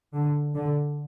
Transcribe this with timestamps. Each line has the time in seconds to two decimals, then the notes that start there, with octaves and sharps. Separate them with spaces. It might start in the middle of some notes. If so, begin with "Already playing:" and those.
0.14 D3
0.55 D3